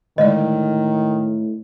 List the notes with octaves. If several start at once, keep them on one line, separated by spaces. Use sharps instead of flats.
A2 D3 D#3 G#3 D5 D#5